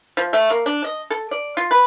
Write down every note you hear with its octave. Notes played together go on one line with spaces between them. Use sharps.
F3
A3
A#3
D4
D#5
A4
D5
F4
B4